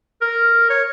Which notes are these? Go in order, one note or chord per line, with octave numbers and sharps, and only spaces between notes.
A#4
C#5